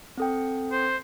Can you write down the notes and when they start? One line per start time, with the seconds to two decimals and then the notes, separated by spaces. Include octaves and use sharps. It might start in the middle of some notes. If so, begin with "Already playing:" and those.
0.17 C4 A4 G5
0.72 C5